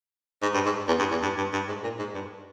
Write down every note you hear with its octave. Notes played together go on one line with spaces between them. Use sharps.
G#2
G2
G#2
E2
G2
E2
G2
G2
G2
G#2
A#2
G#2
G2